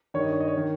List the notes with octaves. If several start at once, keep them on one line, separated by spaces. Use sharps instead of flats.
G2 D#3 C#5
D#5
C#5
D#5
C#5
D#3